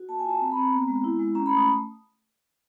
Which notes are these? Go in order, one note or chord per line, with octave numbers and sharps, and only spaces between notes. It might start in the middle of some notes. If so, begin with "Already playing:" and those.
Already playing: F#4
A#3 A5
G#5
F4 A5
C4 A#5
B5
C4 A#5
B3
G#3
E4
G#3
C#4 A#5
B5
A3
D#6